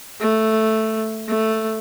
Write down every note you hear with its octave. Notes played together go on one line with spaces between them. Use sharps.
A3
A3